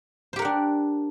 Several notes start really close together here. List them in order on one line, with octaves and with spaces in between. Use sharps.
C5 G4 A#4 F#5 D4